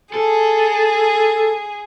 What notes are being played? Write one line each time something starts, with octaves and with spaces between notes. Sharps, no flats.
G#4 A4